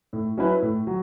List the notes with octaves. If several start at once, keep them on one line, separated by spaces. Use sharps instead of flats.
A2
F#3 C#4 E4 B4
A2
F#3